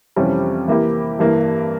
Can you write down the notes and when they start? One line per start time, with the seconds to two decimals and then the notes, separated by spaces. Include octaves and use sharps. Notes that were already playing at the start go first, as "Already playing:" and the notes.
0.16 F2 C3 E3 G3 C#4
0.68 E3 A#3 E4 G4
1.19 G2 E3 A#3